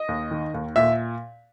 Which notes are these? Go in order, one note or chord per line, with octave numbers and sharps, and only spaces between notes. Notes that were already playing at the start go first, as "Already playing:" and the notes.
Already playing: D#5
D#2
D#3
D#2
A#2 E5